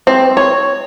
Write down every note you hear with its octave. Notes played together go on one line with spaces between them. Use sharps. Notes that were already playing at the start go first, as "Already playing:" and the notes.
C4
C#5